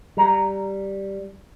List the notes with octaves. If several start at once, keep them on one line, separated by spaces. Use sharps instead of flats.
G3 A#5